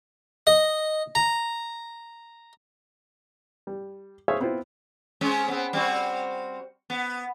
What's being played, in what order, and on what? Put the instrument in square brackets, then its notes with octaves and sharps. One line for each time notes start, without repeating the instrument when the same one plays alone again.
[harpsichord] D#5
A#5
[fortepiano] G3
G#4 C5 C#5 E5 F5
B3 C4 E4 F4 C5
[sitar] G#3 C4 C#4
B3 C4
G3 C4 F#4
B3